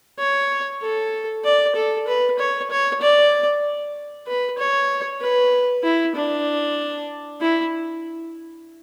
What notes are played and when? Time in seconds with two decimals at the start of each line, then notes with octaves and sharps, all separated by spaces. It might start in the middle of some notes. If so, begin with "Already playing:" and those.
0.19 C#5
0.82 A4
1.44 D5
1.76 A4
2.08 B4
2.39 C#5
2.71 C#5
3.01 D5
4.27 B4
4.58 C#5
5.21 B4
5.83 E4
6.15 D4
7.41 E4